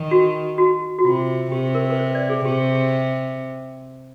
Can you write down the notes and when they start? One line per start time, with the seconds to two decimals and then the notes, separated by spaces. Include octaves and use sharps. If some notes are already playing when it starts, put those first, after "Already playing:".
Already playing: D#3
0.11 F#4
0.58 F#4
0.99 F#4
1.04 C3 F4
1.51 C3 G4
1.75 A#4
1.90 B4
1.99 C5
2.15 D5
2.30 G#4
2.45 C3 G4